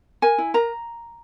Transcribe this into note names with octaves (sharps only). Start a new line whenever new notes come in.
A#4 G#5
E4
A#4 A#5